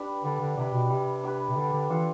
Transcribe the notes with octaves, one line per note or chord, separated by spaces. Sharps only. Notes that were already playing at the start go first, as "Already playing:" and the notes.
Already playing: D4 G4 B4
D3 G3
D3
C3 D4 G4 B4
B2
C3 G3
D4 G4 B4
C3
D3 G3
D3
E3 D4 F4 A4